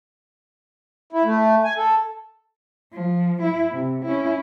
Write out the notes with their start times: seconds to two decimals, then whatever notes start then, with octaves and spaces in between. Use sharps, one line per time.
1.12 E4
1.24 A3
1.64 G#5
1.77 A4
2.93 F3
3.42 E4
3.72 C3
4.05 C#4 E4